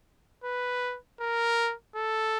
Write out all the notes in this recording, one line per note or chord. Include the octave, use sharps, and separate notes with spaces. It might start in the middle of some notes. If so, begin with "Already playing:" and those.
B4
A#4
A4